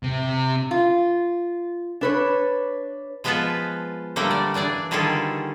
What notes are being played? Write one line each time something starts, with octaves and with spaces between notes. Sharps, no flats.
C3
F4
D4 B4 C#5
F3 G#3 B3 F4 B4 A5
D3 G3 A3 A#3 D4 A4
D5
E3 D4 G#4 D5
D3 D#3 G3 F4 G#4 A4